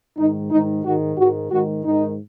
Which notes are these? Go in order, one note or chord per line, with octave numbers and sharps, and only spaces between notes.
G#2 D#3 D#4
G#2 D#3 D#4
G#2 D#3 F#4
G#2 D#3 F#4
G#2 D#3 F#4
G#2 D#3 D#4